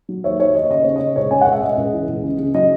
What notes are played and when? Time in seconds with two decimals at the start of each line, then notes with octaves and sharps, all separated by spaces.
0.09 F#3
0.24 D#2 C#5 E5
0.39 D#3 C#5
0.54 D#2 D#5
0.70 C#3 D#5
0.83 C#3 C#5
0.96 C#3 D#5
1.16 C#2 C#5
1.31 C#2 G#5
1.41 F#5
1.46 C#2
1.52 E5
1.62 C#2 D#5
1.78 C#2
1.93 E3
2.08 C#2
2.24 C#3
2.39 C#3
2.54 F#3 D#5